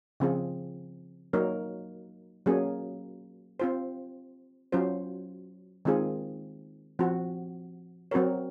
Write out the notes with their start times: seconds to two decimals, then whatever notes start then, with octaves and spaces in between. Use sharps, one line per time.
0.20 C#3 F3 C4 F4 G#4
1.33 F#3 A#3 D#4 A#4 C#5
2.46 F#3 A#3 C#4 G#4
3.60 C4 F4 C5
4.72 F#3 C#4 F4 C5
5.85 D#3 G#3 C4 F4 G#4
6.99 F3 C4 F#4
8.11 F#3 C4 F#4 A#4 C#5